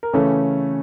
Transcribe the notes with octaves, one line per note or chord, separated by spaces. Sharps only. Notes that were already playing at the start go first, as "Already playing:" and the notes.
A#4
C#3 E3 A3 C#4 A4